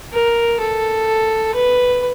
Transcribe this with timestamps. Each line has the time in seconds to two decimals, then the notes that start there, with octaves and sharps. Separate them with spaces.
0.12 A#4
0.60 A4
1.54 B4